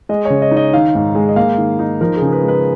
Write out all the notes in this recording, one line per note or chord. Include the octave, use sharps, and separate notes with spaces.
G#3 D#5
C#3 C#5
D#5
D#4
D#5
D#3 F5
G#2
G#3
D#5
A#3 F5
D#3
D#4
F3 A#4
G#4
C#3
B4
G#3
B4